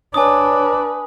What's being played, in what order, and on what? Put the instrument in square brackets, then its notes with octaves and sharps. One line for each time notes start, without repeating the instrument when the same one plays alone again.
[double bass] D4 [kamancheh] B4 [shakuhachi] C#5 [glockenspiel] G#5 D#6